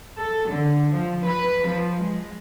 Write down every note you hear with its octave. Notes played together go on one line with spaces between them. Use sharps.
A4
D3
F3
B4
F3
G#3